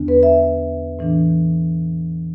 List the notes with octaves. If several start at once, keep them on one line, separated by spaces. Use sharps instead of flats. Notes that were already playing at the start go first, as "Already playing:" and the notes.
Already playing: E2 D3 B3 D4
B4
E5
A2 E3 D4